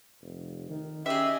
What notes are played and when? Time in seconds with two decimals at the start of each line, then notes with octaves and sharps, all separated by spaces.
0.22 F1
0.69 D#3
1.06 C#4 G4 G#4 D#5 E5